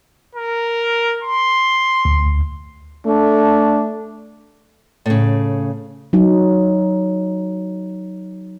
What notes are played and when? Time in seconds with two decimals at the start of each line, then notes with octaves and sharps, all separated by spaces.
0.36 A#4
1.24 C6
2.05 D2
3.06 A3 D4
5.06 A2 C#3
6.13 F#3 D#4